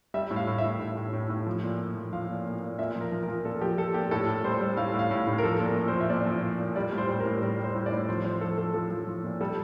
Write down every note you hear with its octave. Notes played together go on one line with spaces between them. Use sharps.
G3 E5
A2
F5
A2
E5
A2
A2
A2
A2
A2
F3
A#2
A#2
F3
F3 F5
A#2
A#2
A#2
A#2 E5
F3
A#4
F3
A#4
F3
A#2 A4
F3 G4
F3 A4
A#2 G4
A2 A4
A2
G3 C5
G3
A2 F5
A2
F5
A2
A2
A#4
F3 A4
A#2
A#4
A#2
C5
F3
E5
A#2 D5
F3
A#2
A#2
G3 D5
A2
C5
G3
A#4
A2
G3 A#4
G3
C5
A2
D5
A2
F3 C5
F3 C5
F3 A4
F3 A4
F3 A4
F3
F3
A#2
G3 A4